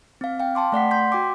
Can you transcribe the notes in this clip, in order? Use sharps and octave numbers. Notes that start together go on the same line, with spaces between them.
C4 F5
F5 G5
G5 A5 C6 D6
A3 D5 F#5 B6
C6 G6 B6
F#4 G5 D6